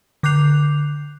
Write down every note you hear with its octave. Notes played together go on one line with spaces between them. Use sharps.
D3 D6 F#6 G6 C7 F7